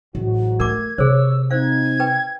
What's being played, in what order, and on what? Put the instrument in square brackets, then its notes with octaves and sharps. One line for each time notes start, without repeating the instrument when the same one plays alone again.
[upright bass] A1 [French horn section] G#2 F#3 F#4
[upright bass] A3 [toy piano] A#4 D6 [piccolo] G#6
[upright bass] C3 [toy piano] G#4 C5 [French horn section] C#5 [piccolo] E6
[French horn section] C4 D#4 [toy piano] C5 F5 [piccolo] G#6
[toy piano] B4 G5